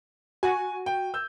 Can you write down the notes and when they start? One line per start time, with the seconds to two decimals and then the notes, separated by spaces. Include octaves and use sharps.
0.43 F#4 G#5
0.86 G5
1.14 E6 G6